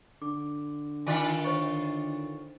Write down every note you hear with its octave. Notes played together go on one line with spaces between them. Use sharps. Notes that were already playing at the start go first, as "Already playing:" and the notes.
D3 D6
D#3 D4 F4 G#5 B6
C5 C#5 C#6